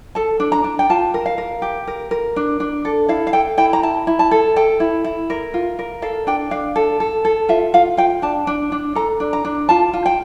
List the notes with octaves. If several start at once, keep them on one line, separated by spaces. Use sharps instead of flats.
A4 A5
D4
A#5
D4
G5
F4 A5
A#4
F5
A#4
G4
A#4
A#4
D4
D4
A4
E4 F5
F5
A4 G5
E4 G5
A#5
E4 A5
E4
A5
A4
A4 G5
E4
E4
A#4
F4
A#4
A4 F5
D4 G5
D4 F5
A4
A4
A4
F4 E5
F4 F5
F4 G5
D4 A5
D4
D4
A4 A#5
D4
A#5
D4
F4 A5
F4
G5